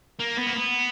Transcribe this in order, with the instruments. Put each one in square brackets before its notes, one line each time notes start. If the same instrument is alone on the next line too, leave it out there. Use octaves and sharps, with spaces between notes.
[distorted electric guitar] A#3
B3
A#3
B3